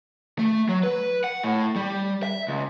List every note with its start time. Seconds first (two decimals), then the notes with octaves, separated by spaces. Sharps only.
0.39 A3
0.69 F#3
0.83 B4
1.24 F#5
1.44 A2
1.76 G3
2.23 E5
2.48 C#2